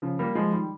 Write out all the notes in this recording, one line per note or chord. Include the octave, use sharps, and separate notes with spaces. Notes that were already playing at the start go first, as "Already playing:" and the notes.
C#3 F3
G3 A#3
F3 G#3
D#3 G3